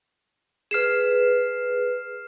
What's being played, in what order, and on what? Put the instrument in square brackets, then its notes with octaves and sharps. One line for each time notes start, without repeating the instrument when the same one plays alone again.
[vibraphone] G#4 B4 [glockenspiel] F6 C7 E7